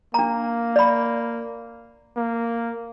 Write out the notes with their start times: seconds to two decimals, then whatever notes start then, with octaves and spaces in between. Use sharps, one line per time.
0.14 A#3 D4 A#5
0.76 D5 B5
2.16 A#3